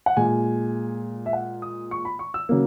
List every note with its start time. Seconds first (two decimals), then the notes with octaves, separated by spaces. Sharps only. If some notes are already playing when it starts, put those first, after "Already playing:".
0.06 F#5
0.17 A#2 G#3 G#5
1.26 E5
1.33 F#5
1.62 D#6
1.91 C#6
2.05 B5
2.19 C#6
2.34 E6
2.49 C#3 F#3 A#3